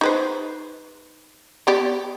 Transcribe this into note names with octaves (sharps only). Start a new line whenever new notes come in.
D#4 B4 C5
B3 G4 D5